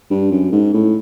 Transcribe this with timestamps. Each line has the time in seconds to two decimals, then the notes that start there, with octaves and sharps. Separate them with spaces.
0.11 G2
0.32 F#2
0.52 G#2
0.74 A2